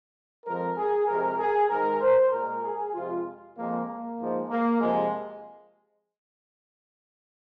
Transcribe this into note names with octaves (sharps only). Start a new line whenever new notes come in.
F2 F3 G#3 A#4
G#4
F2 C3 G#3 A#4
G#4
G#2 D#3 G#3 A#4
C5
A#2 G#3 A#4
G#4
F2 C3 F3 G#3 F4
F2 F3 G#3 A#3
A#3
G#2 F3 G#3
A#3
F2 C3 F3 G#3